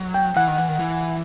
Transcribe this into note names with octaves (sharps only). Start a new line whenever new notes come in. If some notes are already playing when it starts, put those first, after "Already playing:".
Already playing: F#3
G5
E3 F#5
D#3
E3
D#3
E3